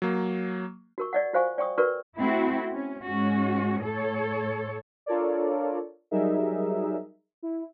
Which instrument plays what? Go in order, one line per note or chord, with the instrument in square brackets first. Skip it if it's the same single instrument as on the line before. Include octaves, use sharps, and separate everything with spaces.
[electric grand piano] F#3 A#3
[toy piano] F#4 A#4 C#6
D5 D#5 F#5
F4 F#4 C5 F5 G#5 C#6
D5 G5 C#6 D#6
F#4 A#4 B4 D5 C#6
[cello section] A3 C4 E4 F#4
C#4
G#2 C#4 F#4
A2 A4 C#5
[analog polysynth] D4 F4 A4 A#4 C#5 D5
F#3 G3 D#4 G#4 A#4 E5
E4